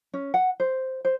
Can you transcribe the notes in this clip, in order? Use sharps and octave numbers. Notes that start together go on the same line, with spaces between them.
C#4
F#5
C5
C5